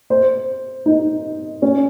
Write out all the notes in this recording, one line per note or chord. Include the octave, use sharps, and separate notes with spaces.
C5
D#4
C#4